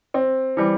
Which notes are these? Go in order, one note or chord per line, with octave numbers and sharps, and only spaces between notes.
C4
E3 G3